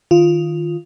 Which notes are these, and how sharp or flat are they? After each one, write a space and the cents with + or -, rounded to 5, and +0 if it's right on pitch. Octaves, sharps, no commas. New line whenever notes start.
D#3 +0 F4 -10